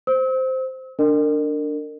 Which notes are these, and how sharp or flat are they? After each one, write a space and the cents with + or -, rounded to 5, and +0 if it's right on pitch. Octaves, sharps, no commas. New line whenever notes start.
C5 -5 E6 -40
D4 +0 A#4 -30 D#5 -40